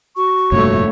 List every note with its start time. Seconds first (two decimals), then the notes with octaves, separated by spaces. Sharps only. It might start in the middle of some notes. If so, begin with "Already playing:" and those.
0.17 F#4 C#6
0.52 F1 G2 A#2 A3 C#5